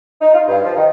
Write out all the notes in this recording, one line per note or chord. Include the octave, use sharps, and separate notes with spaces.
D#4
F4
G2
F3
D#3